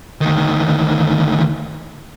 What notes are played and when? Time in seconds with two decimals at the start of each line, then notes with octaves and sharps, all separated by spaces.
0.21 D2 D#3